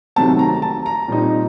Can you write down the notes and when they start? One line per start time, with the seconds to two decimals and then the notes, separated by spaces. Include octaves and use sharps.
0.16 C3 D#3 F#3 A3 C4 A5
0.39 A#5
0.62 A5
0.86 A#5
1.08 A#2 G3 C4 D#4